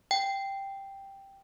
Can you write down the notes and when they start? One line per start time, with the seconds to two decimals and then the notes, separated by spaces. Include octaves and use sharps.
0.11 G5